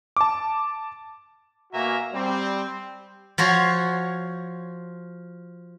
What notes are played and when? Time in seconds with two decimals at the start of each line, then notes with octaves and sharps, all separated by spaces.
0.17 A5 D6
1.73 B2 A#3 F#4 E5 G#5 A#5
2.13 G3 C4
3.38 F3 F#4 C5 C#5